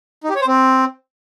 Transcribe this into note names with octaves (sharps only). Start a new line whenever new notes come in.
D#4
G4
C#5
C5
C4